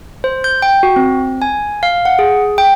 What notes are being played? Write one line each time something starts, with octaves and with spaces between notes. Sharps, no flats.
C5
G6
G5
F#4
C4
G#5
F5
F#5
G#4
G5